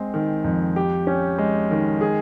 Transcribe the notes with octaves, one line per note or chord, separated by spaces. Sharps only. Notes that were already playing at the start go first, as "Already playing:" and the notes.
Already playing: G#3 C4
D#3
F2
G4
C#4
G#3
D#3
G#4